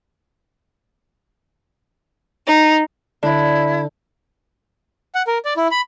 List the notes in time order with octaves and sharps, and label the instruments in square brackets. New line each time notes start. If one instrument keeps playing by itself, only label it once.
[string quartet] D#4
[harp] D3 D4 [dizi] E4
[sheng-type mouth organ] F#5
A#4
D5
E4
B5